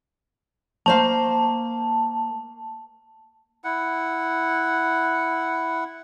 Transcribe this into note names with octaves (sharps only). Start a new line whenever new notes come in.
A#3 C5 F5 A5
E4 F#5